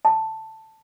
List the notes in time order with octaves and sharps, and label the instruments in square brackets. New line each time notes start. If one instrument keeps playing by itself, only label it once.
[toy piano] A5